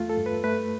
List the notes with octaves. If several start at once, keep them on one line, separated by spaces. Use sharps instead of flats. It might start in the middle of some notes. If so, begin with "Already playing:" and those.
Already playing: E2 A3 F4
A4
G2
B4
A3 B4